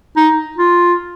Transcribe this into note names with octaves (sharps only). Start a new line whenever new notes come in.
D#4
F4